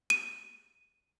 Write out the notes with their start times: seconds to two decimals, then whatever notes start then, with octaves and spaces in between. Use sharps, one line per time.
0.10 D#7